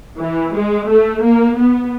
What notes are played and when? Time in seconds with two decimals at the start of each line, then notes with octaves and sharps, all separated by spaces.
0.19 E3
0.53 G#3
0.87 A3
1.22 A#3
1.57 B3